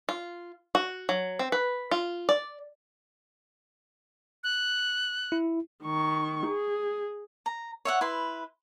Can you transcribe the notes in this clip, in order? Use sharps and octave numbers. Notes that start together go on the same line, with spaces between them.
F4
F#4
F#3
C4
B4
F4
D5
F#6
E4
D#3 C#6
G#4
A#5
C#5 E5 F#5
E4 B4 C6